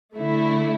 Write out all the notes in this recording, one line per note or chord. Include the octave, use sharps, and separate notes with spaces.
D3 A3 E4